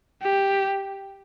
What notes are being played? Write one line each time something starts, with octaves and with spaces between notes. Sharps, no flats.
G4